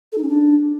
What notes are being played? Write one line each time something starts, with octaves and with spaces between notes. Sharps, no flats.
A4
D#4
C#4
D4